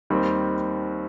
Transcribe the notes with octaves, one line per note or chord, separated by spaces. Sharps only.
D#2 D#3 G3 C4